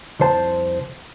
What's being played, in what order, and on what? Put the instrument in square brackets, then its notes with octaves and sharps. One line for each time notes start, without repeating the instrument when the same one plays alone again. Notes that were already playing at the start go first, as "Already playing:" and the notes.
[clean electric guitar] C2 F2 C5 A5